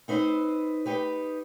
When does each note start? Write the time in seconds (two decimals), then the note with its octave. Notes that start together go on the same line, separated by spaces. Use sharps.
0.08 C4 D#4 B4 C5
0.86 D#4 G4 B4